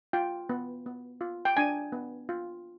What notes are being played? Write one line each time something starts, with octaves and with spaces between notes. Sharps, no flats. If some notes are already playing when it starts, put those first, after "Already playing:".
F4 G5
B3
B3
F4
G5
D4 G#5
B3
F4